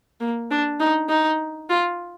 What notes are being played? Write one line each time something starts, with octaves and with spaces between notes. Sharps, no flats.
A#3
D4
D#4
D#4
F4